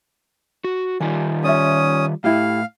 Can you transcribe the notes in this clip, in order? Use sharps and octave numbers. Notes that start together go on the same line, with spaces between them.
F#4
D#3 G3 F4 G#5
C#4 D5 E5 D#6
A2 E4 G4 F5